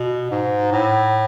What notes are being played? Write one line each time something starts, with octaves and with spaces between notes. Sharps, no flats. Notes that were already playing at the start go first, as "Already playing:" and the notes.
Already playing: B2
G#2
A2